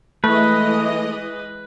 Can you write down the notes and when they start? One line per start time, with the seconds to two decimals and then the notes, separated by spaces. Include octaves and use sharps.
0.24 E3 G#3 A3 B4 D#5